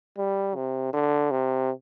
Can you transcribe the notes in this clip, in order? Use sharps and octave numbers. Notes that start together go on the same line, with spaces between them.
G3
C3
D3
C3